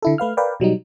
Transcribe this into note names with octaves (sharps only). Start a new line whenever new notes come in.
D3 E4 A4
A3 B4 F5 F6
A#4 B4 D5 F5 G5
B2 F#3 G3 D#4